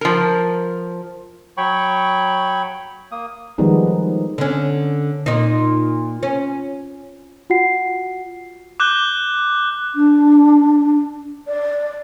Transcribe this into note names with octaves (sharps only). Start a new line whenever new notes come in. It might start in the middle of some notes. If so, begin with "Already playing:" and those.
F3 A#4
F#3 C#5 G5 B5 C#6
A#3 D#6
D#3 F3 G3 G#3 B3 D#4
D3 C#4
A#2 D#4
C#4
F4 F#4 F#5 C7
D6 F#6 G6 G7
D4
D5